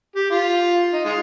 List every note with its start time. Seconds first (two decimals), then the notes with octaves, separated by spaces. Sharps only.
0.16 G4
0.31 F4
0.94 D#4
1.05 G#3 F4